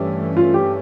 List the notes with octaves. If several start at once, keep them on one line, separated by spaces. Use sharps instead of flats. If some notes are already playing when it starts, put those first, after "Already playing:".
Already playing: G2 E3 A3 C#4 G4
F4
G4